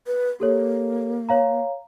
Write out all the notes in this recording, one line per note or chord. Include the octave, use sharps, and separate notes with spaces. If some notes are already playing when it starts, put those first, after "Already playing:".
B4
A#3 G4 A4 C#5
C#5 F5 A#5